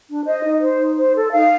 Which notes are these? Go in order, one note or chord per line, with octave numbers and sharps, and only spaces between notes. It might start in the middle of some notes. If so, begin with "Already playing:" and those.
D4
C5 D#5
D#4
C5
D#4
C5
A4
D#4 F5